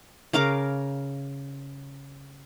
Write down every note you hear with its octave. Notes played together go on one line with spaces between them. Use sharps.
C#3 A#4 F5 D6